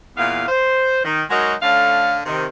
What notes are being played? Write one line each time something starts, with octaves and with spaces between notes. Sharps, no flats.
E2 A#2 E3 B3 F5
C5
D#3
F#3 G#3 D#4 F#4 A#4 D#5
D3 A3 C#4 F5
C3 D#3